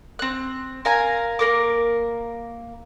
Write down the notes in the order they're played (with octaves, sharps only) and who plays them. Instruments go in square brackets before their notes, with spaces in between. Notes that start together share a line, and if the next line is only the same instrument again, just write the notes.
[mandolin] C4 F#6
A#4 F5 G#5 A#5
A#3 A#4 D6